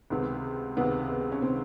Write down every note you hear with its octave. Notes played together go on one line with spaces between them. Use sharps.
C#2 C3 D#3 B3
C#2 C3 D#3 B3
B3
C#4
C3 D#3 C4